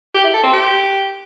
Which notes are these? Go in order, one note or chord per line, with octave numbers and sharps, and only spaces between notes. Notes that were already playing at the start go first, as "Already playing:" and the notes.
G4
E4
A4
C4
G4